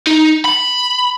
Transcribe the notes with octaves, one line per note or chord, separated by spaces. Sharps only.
D#4
B5